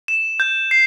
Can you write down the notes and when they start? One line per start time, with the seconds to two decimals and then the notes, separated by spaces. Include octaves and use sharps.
0.08 E7
0.40 G6
0.71 C7